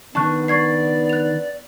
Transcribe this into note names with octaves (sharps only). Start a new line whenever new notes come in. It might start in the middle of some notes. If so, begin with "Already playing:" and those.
D#3 B3 D4 A5 C#6 F#6
D5 C#6 G#6 C7
F#6 F7